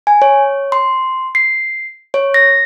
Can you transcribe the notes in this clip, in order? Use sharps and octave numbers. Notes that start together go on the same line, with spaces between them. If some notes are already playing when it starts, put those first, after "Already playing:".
G#5
C#5
C6
C7
C#5
A#6